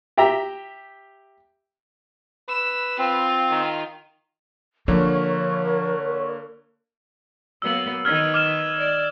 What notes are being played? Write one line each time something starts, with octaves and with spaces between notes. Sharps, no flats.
G4 E5 G5 A#5
B4 E6
C4 F4
D#3
D3 F3 A#3 D4 A#4 C#5
F#3 A#3 B3 E6 F#7
D#3 D#4 B4 F6 G#6
D6 F6 E7
D5